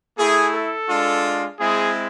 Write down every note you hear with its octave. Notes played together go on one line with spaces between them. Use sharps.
A3 E4 G#4
A4
G#3 D4 F4
G#3 C4 E4 G#4